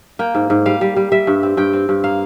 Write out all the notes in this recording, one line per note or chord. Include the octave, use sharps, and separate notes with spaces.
A#3 G5
G#2
G#2
G3 F5
G3
G3
G3 E5
G2
C4
G2 G5
C4
G2
A#3 F5